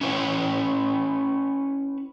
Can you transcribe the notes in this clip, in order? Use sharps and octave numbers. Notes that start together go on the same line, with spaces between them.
C#4 E4 B4 C#5